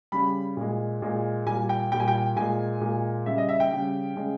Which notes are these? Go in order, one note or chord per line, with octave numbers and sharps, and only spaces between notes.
C#3 G3 B5
A#2 G#3
A#2 G#3
A#2 G3 G#5
G5
A#2 G3 G5
G#5
G5
A#2 G#3 G#5
A#2 G#3
C#3 G3 E5
D#5
E5
G5
C#3 G3
C#3 G#3